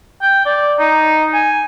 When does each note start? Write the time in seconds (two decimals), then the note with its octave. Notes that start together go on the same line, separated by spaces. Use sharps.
0.22 G5
0.46 D5
0.79 D#4
1.33 G#5